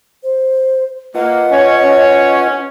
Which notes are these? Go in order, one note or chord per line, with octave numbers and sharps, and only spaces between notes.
C5
A#3 F4 B4 D#5 F#5
C#4 C#5
C#4